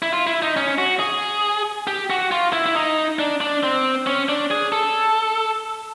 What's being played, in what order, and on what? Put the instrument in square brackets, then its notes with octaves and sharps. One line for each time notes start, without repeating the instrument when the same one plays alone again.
[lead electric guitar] E4
F4
E4
D#4
C#4
F#4
G#4
G4
F#4
F4
E4
E4
D#4
D4
D4
C4
C#4
D4
G#4
A4